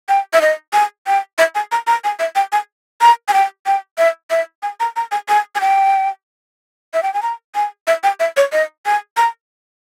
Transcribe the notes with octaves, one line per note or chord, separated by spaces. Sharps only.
G5
E5
D#5
G#5
G5
E5
G#5
A#5
A#5
G#5
E5
G5
G#5
A#5
G#5
G5
G5
E5
E5
G#5
A#5
A#5
G#5
G#5
G#5
G5
E5
G5
G#5
A#5
G#5
E5
G5
E5
C#5
D#5
G#5
A#5